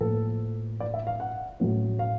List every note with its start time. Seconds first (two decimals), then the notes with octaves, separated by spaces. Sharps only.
0.01 A2 F3 A#3 A4
0.80 D5
0.94 E5
1.07 F5
1.20 F#5
1.60 A2 F#3 A3 C#4
1.99 F5